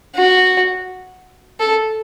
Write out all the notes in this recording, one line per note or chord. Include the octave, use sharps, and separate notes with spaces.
F#4
A4